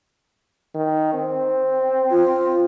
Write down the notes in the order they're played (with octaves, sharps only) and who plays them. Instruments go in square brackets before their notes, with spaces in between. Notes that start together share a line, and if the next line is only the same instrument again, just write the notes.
[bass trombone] D#3
C4
[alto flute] F4